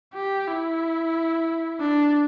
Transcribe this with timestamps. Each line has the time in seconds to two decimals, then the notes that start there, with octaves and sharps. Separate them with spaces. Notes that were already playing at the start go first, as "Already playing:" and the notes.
0.14 G4
0.48 E4
1.80 D4